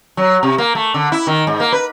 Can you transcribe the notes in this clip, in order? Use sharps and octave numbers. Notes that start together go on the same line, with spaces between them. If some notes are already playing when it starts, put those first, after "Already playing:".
F#3
C3
A#3
A3
D3
E4
D#3
G#2
A#3
B4